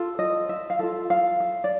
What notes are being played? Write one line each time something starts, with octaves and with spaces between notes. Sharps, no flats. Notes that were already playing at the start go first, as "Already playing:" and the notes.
Already playing: F4 A4
D#5
E5
F5
F4 A4 E5
F5
E5
D5